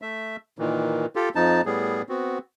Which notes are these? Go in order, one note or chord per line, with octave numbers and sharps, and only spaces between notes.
A3 E5
A#2 D#3 E3
F4 G4 A4
F2 F3 D#4 A5
A2 G3 B3 G#4
B3 C4 F#4